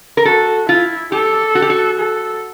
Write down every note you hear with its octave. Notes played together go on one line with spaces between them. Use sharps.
A#4
F#4 A4
E4 F4
G4 A4
F#4
G4
F#4
A4